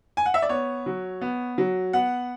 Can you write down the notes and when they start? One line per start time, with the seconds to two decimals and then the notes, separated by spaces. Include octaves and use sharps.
0.17 G#5
0.26 F#5
0.34 E5
0.42 D5
0.49 B3 C#5
0.86 F#3
1.21 B3
1.58 F#3
1.93 B3 F#5